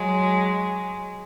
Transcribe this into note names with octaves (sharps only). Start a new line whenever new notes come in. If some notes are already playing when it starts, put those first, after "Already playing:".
Already playing: F#3 G#3